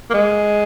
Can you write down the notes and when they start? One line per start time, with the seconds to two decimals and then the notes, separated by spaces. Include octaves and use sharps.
0.10 A#3
0.14 G#3